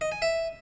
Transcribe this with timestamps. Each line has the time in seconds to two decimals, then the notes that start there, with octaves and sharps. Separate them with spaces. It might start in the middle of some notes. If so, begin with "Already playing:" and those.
0.01 D#5
0.12 G#5
0.22 E5